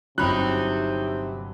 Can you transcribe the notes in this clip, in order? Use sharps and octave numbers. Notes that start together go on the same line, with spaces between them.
G1 C3 F#3 C4 D#4 C#5 B5 F#6